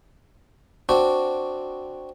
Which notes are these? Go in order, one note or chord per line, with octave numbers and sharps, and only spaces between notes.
C4 D4 F#4